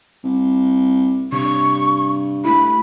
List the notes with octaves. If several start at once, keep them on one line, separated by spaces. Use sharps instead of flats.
C2
G2 C3 C#6
A3 E4 B5